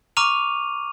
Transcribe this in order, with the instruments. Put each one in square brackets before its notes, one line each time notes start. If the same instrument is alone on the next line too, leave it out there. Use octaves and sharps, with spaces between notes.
[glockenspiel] A#5 C#6 D6 F6 D#7 F7